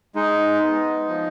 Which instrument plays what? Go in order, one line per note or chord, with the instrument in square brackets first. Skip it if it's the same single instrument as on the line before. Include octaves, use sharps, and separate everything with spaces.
[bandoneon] G#3 D#4
B3
F3